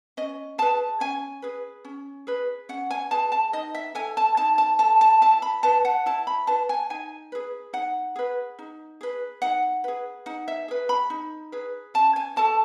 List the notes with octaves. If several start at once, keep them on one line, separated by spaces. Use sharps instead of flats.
C#4 D#5
G#4 B4 A5
C#4 G#5
G#4 B4
C#4
G#4 B4
C#4 F#5
G#5
G#4 B4 A5
A5
D#4 D#5
E5
A4 G#5
A5
D#4 A5
A5
A4 A5
A5
E4 A5
B5
B4 A5
F#5
E4 A5
B5
B4 A5
G#5
D#4 G#5
G#4 B4
D#4 F#5
G#4 B4
D#4
G#4 B4
D#4 F#5
G#4 B4
D#4 F#5
E5
G#4 B4
B5
D#4
G#4 B4
C#4 A5
G#5
F#4 A4 A5